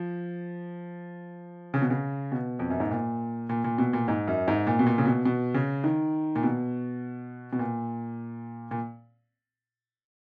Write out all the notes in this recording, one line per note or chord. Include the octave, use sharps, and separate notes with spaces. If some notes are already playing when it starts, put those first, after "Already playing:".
Already playing: F3
C#3
B2
C#3
B2
F2
F#2
G#2
A#2
A#2
A#2
B2
A#2
G#2
F#2
G#2
A#2
B2
A#2
C#3
B2
B2
C#3
D#3
A#2
B2
B2
A#2
A#2